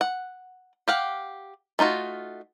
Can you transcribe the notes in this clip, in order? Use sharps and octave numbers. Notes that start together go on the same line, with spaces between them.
F#5
G4 F5 F#5
A3 D#4 F4 F#4